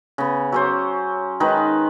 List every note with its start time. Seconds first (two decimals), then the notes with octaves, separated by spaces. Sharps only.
0.18 C#3 B3
0.52 F#3 C#4 C5
1.40 D#3 G#3 D#4 B4